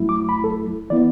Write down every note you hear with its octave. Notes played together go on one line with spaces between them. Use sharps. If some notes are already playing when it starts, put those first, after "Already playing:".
Already playing: F#2 F#3 A3 E4
D6
B5
A4
E3 B3 E4 D5